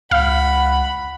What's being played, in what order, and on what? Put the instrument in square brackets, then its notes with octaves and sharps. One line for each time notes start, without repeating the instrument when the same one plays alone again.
[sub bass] C#2 [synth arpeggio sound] F5 [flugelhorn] F#5 [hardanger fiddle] B5